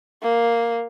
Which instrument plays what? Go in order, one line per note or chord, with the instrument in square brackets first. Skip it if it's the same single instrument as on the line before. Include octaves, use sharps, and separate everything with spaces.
[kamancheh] A#3